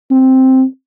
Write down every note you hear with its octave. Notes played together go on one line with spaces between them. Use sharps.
C4